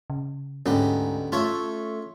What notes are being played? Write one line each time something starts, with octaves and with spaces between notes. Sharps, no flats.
C#3
D2 G#2 B3 C#4 G4
A3 F4 C#5 E5